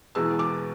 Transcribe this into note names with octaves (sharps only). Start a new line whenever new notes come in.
E2 B2 G#3 E6
D6